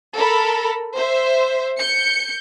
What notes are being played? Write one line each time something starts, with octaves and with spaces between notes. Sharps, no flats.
A4 A#4 B5
C5 E5
G6 C#7